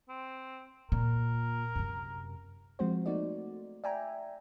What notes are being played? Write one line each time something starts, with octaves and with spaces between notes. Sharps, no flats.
C4
A#2 A#4
F#2 C3
F3 G#3 C4 F#4 C5
A3 A#3 D#4 F#4 D5
D5 E5 G5 G#5 A#5